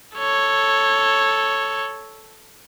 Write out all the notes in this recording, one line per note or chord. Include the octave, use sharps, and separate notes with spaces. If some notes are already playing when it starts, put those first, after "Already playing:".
A4 C#5